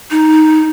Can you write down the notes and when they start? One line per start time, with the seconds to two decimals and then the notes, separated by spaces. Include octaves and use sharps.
0.11 D#4